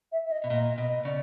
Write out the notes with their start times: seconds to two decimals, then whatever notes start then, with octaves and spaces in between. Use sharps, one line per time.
0.12 E5
0.26 E5
0.31 D#5
0.44 B2
0.50 A#2 D#5
0.78 B2 D#5
1.05 C#3 D5